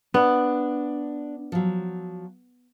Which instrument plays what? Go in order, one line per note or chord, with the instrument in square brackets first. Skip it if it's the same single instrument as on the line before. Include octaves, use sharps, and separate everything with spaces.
[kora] B3 [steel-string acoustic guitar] D4
[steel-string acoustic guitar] F3 F#3